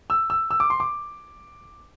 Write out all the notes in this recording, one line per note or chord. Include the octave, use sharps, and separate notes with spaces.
E6
E6
E6
D6
C6
D6